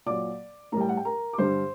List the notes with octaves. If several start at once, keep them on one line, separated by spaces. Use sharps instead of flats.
A#2 F#3 D5 D6
A2 G3 A#4 G5 A#5
F#5
G5
A#4 A#5
D6
G2 D3 G3 C5 C6